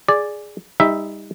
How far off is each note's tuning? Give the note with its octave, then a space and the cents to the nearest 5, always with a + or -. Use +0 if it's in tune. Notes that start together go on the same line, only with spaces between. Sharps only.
G#4 +0 D5 +0
G3 +35 D#4 +20 E5 +0